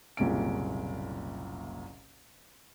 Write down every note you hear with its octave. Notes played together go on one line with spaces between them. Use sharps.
F#1 C2 A#2 C#4 D7